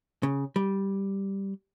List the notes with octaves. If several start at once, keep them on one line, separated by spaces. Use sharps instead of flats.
C#3
G3